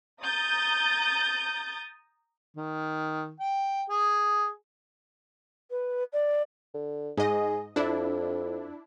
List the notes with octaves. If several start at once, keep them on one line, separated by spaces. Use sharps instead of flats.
A#5 D#6 G6 A6
D#3
G5
G#4
B4
D5
D3
G#2 G#4 D#5
F2 D4 E4